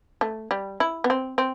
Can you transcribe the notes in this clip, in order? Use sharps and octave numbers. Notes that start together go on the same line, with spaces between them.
A3
G3
E4
B3
C4
C4